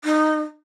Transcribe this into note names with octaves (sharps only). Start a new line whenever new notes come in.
D#4